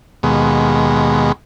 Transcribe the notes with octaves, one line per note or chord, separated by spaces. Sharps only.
D#2 B2 G#3